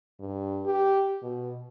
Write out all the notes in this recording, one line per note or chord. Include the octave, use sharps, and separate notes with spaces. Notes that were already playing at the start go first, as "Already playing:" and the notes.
G2
G4
B2